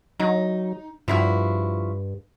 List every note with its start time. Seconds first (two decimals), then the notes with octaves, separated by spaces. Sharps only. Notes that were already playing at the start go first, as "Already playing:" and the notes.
0.20 F#3 D#4
1.08 G2 F3 E4 F#4